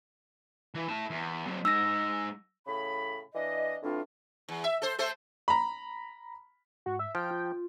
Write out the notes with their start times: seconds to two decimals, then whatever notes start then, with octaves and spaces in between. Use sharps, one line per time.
0.75 E3
0.88 E4 A5
1.10 E2
1.46 F#3 C4
1.65 G#3 D#4 E6 A#6
2.67 A2 C#3 B5
3.34 E3 D4 D#5
3.83 A2 E3 C4 D4 F4
4.49 E2
4.64 E5
4.82 A4 C5
4.99 A3 A4 C5
5.48 A#5 B5
6.86 G#2 F#4
6.99 E5
7.15 F3 G5 F6
7.31 F4